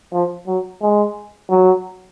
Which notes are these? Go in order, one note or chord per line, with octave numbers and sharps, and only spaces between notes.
F3
F#3
G#3
F#3